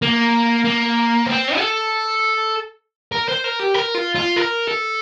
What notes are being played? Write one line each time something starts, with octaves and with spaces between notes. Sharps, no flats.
A#3
A#3
C4
A4
A#4
C5
A#4
G4
A#4
F4
F4
A#4
A4